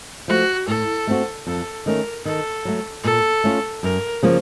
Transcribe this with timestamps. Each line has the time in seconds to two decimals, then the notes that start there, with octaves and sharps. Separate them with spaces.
0.28 F3 A3 F#4
0.68 A2 A4
1.07 A3 C4 F#4
1.47 F2 A4
1.86 D#3 A3 C#4 A#4
2.25 D#3 A4
2.65 F#3 A3
3.04 A#2 A4
3.44 A3 C#4 F4
3.83 F#2 A#4
4.23 C#3 F3 A#3